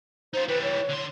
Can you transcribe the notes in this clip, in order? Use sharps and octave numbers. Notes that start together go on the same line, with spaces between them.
D#4 F4 C5
E3 G3 B4
C#5
D3 C6